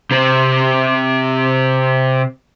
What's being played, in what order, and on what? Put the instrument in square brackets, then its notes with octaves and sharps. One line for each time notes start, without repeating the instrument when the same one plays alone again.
[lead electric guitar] C3 C4